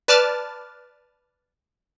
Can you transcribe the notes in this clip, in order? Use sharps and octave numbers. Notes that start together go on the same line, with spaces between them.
B4 D5 A5 D6 F6 A6